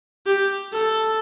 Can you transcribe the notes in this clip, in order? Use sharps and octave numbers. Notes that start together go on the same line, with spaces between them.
G4
A4